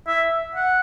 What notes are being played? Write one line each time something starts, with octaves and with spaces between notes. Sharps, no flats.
E5
F#5